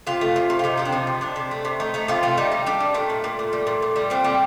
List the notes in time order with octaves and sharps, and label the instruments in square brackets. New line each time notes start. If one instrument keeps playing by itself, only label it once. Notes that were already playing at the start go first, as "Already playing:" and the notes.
[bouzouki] C3 F4
A3
C3
C3
F4
C3 D#4
C3 C4
D4
F3 D#4
C3
C3 D4
C3
A3
C3
A3 D#4
A3 D#4
C3 F4
A3 F4
G3 D#4
G3
G3 D4
G3
A#2 A3
A#2
A#2
A#2
G3
A#2
A#2
G3
A#2 C4
G3